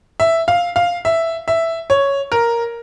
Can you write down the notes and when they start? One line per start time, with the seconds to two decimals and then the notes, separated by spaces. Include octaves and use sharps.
0.20 E5
0.48 F5
0.76 F5
1.05 E5
1.48 E5
1.90 C#5
2.32 A#4